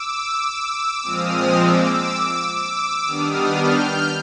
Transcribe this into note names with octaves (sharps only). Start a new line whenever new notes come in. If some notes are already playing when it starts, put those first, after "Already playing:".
Already playing: D6 E6
A#2 F3 G#3 C4 D#6 F6
D6 E6
D6 E6
D#3 G3 B3 D4 D#6 F6
F6 G6